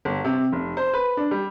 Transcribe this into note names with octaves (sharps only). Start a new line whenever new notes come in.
G1
C3
F1
C5
B4
D4
G3